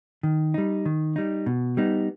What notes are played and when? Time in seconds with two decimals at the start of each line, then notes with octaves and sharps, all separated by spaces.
0.23 D#3
0.54 G3 D#4
0.86 D#3
1.16 G3 D#4
1.46 B2
1.77 G3 B3 D#4